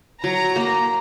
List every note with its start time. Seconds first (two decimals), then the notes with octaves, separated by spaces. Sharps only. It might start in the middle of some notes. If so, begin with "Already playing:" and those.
0.23 F#3 A#5
0.56 A#3